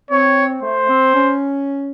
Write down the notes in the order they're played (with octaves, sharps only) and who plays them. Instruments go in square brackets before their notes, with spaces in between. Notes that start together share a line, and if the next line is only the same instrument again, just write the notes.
[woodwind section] C4 [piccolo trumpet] C#5
[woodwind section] A3 [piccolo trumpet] C5
[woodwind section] C4
C#4